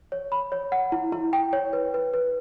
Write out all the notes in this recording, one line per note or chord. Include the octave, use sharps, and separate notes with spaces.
C#5
B5
C#5
F#5
E4
E4
G5
C#5
B4
B4
B4